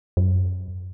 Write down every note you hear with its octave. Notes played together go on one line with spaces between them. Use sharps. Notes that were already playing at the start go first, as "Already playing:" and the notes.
F#2